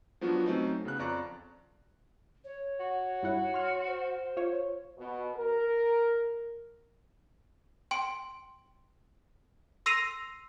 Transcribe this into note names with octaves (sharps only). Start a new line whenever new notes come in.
F3 F#3 B3 D4 F4 F#4
F#3 A3 C4 C#4 D#4
C#3 B3 F#6
F2 F4 D5 A#5 C#6 F#6
C#5
F#4
G2 E4 F#5
C6 F6
C5
F4 C#5
B2
A#4
G5 C6 D7
C6 E6 A#6 C7 D#7 F7